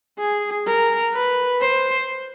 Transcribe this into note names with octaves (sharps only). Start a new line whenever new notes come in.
G#4
A#4
B4
C5